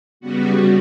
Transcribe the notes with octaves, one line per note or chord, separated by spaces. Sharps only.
C#3 G3 B3 F#4